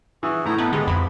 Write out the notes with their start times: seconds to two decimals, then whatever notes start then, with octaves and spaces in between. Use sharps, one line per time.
0.23 E3 F#4 G#4
0.45 A2 A3 B3 E4 A#5
0.58 B3 D#4 A4
0.73 D3 G#3 B3 G4
0.87 F2 B5